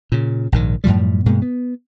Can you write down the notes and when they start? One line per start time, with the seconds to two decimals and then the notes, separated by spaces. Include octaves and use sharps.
0.12 A#2 C#3
0.52 A#1 G#2 D#3
0.84 F#2 A2 F3 G3
1.26 G2 B2 G#3 A#3
1.42 B3